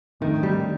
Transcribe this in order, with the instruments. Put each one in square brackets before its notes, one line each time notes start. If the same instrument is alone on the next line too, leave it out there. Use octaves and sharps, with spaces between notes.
[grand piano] F2 D3 A3 [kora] D#3
[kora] G3